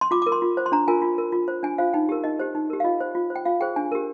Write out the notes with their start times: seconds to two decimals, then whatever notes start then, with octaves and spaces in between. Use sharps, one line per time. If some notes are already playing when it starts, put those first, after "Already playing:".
0.01 C6
0.11 F4 D6
0.22 A#4 D6
0.32 C6
0.42 F4
0.57 C5
0.66 C6
0.72 D4 A#5
0.88 F4 A#4 G#5
1.02 F4
1.18 A#4
1.32 F4
1.48 C5
1.63 D4 G#5
1.78 F4 C5 F5
1.93 D#4 G5
2.09 G4 A#4
2.24 D#4 D#5
2.39 G4 C5
2.55 D#4
2.70 G4 A#4
2.80 F5
2.84 F4 D#5
3.01 C5
3.15 F4
3.30 C5
3.36 G5
3.45 F4 F5
3.61 G#4 C5 G5
3.76 D4 G#5
3.92 G4 A#4